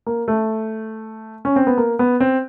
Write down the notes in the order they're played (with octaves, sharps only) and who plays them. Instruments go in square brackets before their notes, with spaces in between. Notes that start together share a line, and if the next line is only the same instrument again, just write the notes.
[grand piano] A#3
A3
C#4
C4
B3
A#3
B3
C4